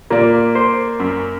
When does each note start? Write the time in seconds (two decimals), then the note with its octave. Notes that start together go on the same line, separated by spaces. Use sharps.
0.10 A#2 A#3 D5
0.55 C5
1.00 F#2